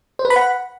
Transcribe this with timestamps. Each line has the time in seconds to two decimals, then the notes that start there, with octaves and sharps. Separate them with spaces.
0.19 C5
0.25 B4
0.30 B5
0.36 F#5